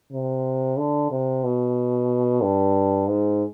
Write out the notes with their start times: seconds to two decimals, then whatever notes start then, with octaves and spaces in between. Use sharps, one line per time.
0.12 C3
0.78 D3
1.11 C3
1.43 B2
2.42 G2
3.09 G#2